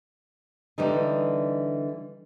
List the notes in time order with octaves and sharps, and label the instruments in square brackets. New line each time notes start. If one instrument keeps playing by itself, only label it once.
[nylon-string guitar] D3 E3 G3 D#4